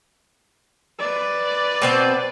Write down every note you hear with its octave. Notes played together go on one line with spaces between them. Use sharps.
B4 D5
B2 C4 C5